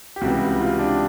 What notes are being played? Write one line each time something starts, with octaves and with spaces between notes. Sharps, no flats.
G4
C#2 C3 E3 G3 F#4
F4
D4